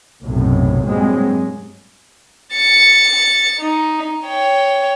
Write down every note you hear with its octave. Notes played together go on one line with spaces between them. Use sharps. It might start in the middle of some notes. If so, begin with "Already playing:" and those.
B1 F#2 A2 C3 F#3
G2 A#2 F#3 G#3 C4
A6 C#7
D#4
C#5 G5